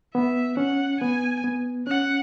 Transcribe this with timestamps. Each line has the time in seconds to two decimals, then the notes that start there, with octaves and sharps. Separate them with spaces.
0.15 B3 E5
0.57 C#4 F#5
1.01 B3 G#5
1.44 B3
1.87 C#4 F#5